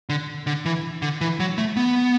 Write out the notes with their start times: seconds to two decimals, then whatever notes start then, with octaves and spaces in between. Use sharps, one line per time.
0.09 D3
0.47 D3
0.65 E3
1.02 D3
1.21 E3
1.40 F#3
1.58 A3
1.77 B3